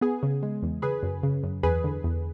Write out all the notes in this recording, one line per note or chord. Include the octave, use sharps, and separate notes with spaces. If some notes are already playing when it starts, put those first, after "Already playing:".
B3 G#4
C#3
G#3
E2
C#3 G#4 B4
F#2
C#3
F#2
E2 G#4 B4
D3
E2